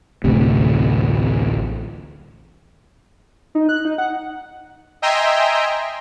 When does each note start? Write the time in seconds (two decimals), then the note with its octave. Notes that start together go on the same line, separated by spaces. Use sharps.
0.24 A1 D2 C3
3.55 D#4
3.69 F#6
3.85 D#4
3.98 F#5
5.02 D#5 E5 G5 G#5 A#5 C6